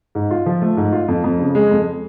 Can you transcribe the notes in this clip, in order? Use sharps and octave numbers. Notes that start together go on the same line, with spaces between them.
G#2
F4
F3
A3
G#2
F4
F2
F2
C#3
G#3
F2